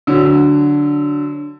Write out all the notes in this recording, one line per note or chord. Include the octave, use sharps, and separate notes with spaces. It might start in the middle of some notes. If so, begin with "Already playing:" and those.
D3 F#3